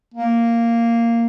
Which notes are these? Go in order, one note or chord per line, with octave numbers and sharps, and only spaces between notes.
A#3